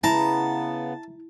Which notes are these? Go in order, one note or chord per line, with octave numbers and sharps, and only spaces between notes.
C#3 B3 E4 A5 A#5